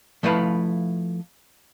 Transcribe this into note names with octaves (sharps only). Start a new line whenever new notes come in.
F3 A3 E4 B4 F5